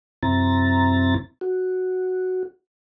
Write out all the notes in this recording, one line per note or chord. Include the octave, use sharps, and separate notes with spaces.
F#2 C3 C4 E4 A#5 A6
F#4